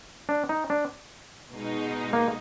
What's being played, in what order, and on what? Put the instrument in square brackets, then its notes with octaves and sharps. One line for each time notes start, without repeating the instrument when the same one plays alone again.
[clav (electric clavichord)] D4
D#4
D4
[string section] B2 G#3 D#4
[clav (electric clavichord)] A#3